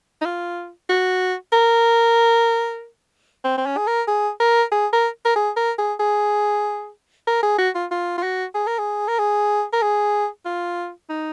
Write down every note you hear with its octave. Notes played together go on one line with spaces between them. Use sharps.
D#4
F4
F#4
A#4
C4
C4
C#4
G#4
A#4
G#4
A#4
G#4
A#4
A#4
G#4
A#4
G#4
G#4
A#4
G#4
F#4
F4
F4
F4
F#4
G#4
A#4
G#4
A#4
G#4
A#4
G#4
F4
D#4